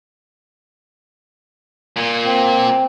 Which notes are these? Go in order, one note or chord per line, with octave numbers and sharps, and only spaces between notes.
A#2
C4